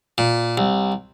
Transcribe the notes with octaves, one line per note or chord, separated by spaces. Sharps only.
A#2
C2